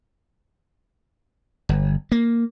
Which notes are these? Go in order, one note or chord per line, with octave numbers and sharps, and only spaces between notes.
G1
A#3